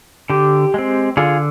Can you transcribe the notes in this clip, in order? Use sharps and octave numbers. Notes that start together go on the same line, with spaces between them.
D3 G4
G#3 C4
D3 F4 G#4